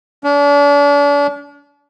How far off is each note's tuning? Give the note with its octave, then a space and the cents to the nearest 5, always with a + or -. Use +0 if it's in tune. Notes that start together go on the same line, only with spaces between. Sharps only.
D4 -40